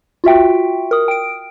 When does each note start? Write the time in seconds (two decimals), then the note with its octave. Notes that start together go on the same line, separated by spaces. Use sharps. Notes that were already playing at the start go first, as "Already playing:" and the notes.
0.24 F4 F#4 E5 G5
0.91 A#4 D#6
1.08 G5 D7